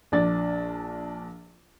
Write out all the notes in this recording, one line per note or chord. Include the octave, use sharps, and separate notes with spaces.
A#1 D4 A6